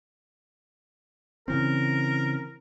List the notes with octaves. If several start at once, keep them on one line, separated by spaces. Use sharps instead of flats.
C#3 E3 C4 A#4